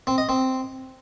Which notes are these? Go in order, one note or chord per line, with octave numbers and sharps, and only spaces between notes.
C4
D#5
C4